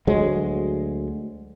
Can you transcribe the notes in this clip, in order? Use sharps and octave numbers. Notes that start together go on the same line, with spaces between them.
D2 F#3 G#3